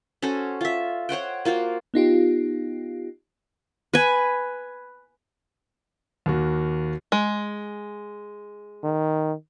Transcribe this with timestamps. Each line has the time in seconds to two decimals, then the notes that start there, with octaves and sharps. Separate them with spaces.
0.22 C#4 F#4 A4 C5
0.61 F4 E5
1.09 C5 C#5 F#5 G5
1.45 A#3 F4 F#4 C5
1.94 B3 D#4 F4 G4
3.94 B4 G#5
6.26 D#2 A#3 F#4
7.12 G#3
8.84 D#3